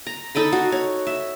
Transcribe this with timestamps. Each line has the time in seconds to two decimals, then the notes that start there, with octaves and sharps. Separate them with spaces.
0.07 A#5
0.35 D#4 A4 D#5 B5
0.52 F#4
0.72 C#5
1.07 E5